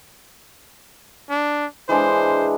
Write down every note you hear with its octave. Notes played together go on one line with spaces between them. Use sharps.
D4
E3 G#3 D4 C5